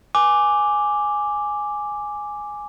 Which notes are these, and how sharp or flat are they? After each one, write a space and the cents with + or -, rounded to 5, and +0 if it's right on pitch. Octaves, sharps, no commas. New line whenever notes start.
G#5 +0 D6 +0